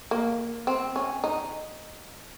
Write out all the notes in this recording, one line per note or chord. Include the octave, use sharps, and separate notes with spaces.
A#3
C4
C#4
D#4